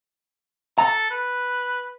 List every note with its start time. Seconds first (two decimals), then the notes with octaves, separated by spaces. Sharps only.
0.78 A4 A#5
1.10 B4